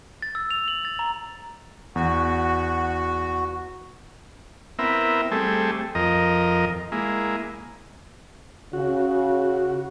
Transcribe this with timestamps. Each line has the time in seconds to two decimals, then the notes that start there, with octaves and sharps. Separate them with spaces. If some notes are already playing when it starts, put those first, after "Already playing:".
0.22 A6
0.35 E6
0.51 F7
0.68 F#7
0.85 A6
0.99 A#5
1.96 E2 F#4
4.79 B3 C4 E4 A#4 E5
5.31 G3 A3 C4 G#4 A4
5.95 F2 A#4 D#5
6.92 G#3 A#3 E4
8.73 C#3 F#4